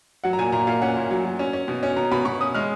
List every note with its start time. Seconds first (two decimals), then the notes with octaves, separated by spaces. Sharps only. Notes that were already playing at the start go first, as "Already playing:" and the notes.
0.24 F#3 F#5
0.33 A#5
0.38 A#2 G#5
0.52 A#2 A#5
0.67 A#2 F5
0.82 C#4 F#5
0.97 A#2
1.11 F#3
1.24 F#3
1.39 C#4
1.53 C#4
1.68 B2
1.83 C#4
1.96 B2 A#5
2.11 B2 B5
2.25 B2 C#6
2.41 C#4 D#6
2.54 G#3 F6